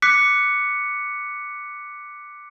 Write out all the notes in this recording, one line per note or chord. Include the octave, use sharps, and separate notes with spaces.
D6 F#6 B6 C#7